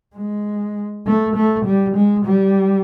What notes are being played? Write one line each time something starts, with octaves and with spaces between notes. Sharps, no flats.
G#3
A3
A3
G3
G#3
G3